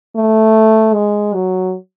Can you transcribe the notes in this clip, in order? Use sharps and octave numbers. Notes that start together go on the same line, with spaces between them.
A3
G#3
F#3